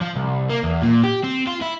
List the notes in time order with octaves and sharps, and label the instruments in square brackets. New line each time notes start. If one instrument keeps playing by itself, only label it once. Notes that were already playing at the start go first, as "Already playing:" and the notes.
[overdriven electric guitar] F3
C2
A#3
E2
A#2
G4
C4
F4
E4